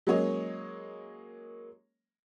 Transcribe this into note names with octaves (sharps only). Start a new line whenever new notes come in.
F#3 G#3 A#3 C#4 C#5 D#5